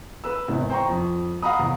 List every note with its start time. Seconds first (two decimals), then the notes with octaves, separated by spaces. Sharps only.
0.24 B4 E6
0.48 G#1 E2 E3
0.70 C5 G5 A#5 C#6
0.88 F2
1.42 F5 F#5 A#5 B5 D#6
1.59 E2